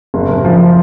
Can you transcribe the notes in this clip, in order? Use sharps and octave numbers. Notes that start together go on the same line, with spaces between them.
F#1
F#1
F3